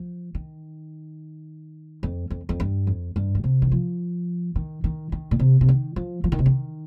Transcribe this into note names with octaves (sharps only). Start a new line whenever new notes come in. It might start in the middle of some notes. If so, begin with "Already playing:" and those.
Already playing: F3
D#3
F2
F2
F2
G2
F2
G2
D#3
C3
D#3
F3
D#3
D#3
D#3
A#2
C3
C3
D#3
F3
F3
D#3
C3
D#3